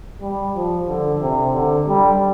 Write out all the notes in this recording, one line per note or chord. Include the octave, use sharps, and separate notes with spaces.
G3
F3
D3
C3
D3
G3